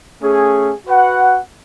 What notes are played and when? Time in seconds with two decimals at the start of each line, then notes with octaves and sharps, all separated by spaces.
0.21 A3 C#4 G#4
0.87 F#4 B4 F#5